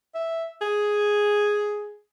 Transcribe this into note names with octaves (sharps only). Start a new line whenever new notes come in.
E5
G#4